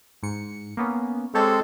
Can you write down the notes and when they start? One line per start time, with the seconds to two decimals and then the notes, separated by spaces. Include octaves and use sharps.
0.23 G#2 C#7
0.77 A#3 B3 C#4
1.35 G#3 C4 G4 A4 C#5 A5